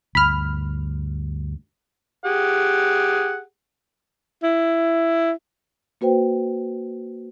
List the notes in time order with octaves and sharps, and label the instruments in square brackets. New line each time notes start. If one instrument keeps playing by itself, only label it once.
[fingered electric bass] D2 G2 [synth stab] B5 F6
[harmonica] G4 G#4 F#5
[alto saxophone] E4
[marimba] A#3 F#4 B4 C5 G5